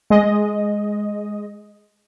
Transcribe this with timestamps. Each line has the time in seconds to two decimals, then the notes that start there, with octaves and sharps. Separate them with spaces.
0.10 G#3 D#5